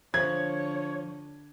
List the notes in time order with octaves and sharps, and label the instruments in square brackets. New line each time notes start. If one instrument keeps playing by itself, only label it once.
[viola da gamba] D3 [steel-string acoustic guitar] F3 [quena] C#5 [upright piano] G#6